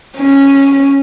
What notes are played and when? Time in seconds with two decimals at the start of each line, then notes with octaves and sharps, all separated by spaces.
0.18 C#4